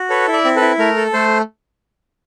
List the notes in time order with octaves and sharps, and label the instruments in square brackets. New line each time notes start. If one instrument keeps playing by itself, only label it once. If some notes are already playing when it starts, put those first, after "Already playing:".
Already playing: [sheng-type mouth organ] F#4
A4 B4 C#5
E4
D5 E5
C4
A4 B4
E4
A3 A#4
A4
A3 C5